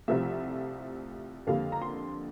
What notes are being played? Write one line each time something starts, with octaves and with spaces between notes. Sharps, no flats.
C2 C3 F3 A3 E5
F2 D3 G3 A#3 F5
A#5
C6